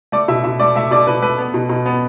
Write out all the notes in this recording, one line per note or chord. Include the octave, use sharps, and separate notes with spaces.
A3 D5
B2 E5
B2 E5
A3 D5
A3 E5
B2 D5
B2 B4
A3 B4
B3
B2
B2
B3